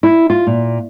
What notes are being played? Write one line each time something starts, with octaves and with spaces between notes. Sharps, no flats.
E4
F4
A#2